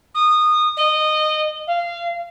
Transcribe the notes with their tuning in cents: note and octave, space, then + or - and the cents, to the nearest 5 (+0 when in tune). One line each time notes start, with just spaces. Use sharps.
D#6 -20
D#5 -15
F5 -20